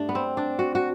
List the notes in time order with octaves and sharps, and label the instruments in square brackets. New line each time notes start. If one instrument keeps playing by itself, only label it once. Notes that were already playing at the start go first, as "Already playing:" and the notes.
Already playing: [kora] G2 A3 D4
B3
C4
D4
F#4
F#4